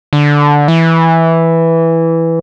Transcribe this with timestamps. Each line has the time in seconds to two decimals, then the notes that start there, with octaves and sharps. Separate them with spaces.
0.13 D3
0.68 E3